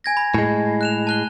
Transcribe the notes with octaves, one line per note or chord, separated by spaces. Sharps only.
G#5 G#6 A#6
B5
A2 G#3
F#6 E7 F7
A5 F#6 G7